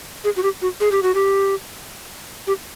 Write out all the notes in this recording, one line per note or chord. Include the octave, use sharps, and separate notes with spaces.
G#4
F#4
G4
F#4
G#4
G4
F#4
G4
G4